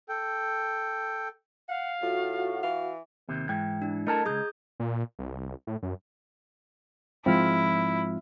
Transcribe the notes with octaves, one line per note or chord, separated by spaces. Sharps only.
A4 G5
F5 F#5
A2 F4 F#4
E3 F5
D#2 C3
G#2 E3 G5
D4 E4
A3 A#4 D#5 A5 A#5 G#6
C#2 G2 G#4 D#6 G6
A#2
C2
A2
F#2
G#2 F3 G#3 C4 E4 F4 F6